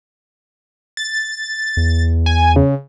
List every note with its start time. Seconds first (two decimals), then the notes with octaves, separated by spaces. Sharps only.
0.97 A6
1.77 E2
2.26 G#5
2.56 C#3